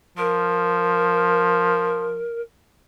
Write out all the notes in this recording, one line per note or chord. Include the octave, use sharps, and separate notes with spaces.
F3 A#4